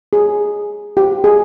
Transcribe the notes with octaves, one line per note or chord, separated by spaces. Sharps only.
G#4
G4
G#4